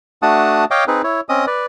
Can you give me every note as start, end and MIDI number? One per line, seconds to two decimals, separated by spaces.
0.22 0.65 57
0.22 0.65 62
0.22 0.65 66
0.22 0.65 78
0.22 0.65 81
0.22 0.65 87
0.71 0.84 73
0.71 0.84 75
0.71 0.84 77
0.71 0.84 79
0.71 0.84 86
0.88 1.02 60
0.88 1.02 63
0.88 1.02 68
0.88 1.02 71
1.04 1.21 64
1.04 1.21 73
1.29 1.46 60
1.29 1.46 61
1.29 1.46 75
1.29 1.46 87
1.47 1.66 71
1.47 1.66 74